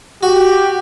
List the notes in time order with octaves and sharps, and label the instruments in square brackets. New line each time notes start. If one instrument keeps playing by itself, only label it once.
[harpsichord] F#4 [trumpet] G4